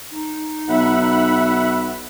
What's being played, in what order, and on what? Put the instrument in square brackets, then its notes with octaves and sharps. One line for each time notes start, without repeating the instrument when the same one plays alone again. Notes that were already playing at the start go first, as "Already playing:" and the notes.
[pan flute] D#4
[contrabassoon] B1 [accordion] E5 F#5 B5